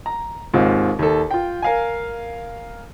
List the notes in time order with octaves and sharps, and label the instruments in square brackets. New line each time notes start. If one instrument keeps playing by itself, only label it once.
[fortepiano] A#5
D#2 G#2 C4 F4
D#2 A4
F4 G5
A#4 F5 G#5